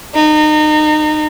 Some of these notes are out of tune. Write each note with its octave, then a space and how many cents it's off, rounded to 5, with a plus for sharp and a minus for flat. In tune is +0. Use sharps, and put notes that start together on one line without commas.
D#4 -30